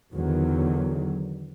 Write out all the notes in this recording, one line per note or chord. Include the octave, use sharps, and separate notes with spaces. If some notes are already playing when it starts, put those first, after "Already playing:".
E2 D3 D#3 F#3